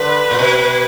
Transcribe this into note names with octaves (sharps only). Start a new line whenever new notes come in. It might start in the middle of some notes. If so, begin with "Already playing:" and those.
Already playing: D3 B4
A#2
B2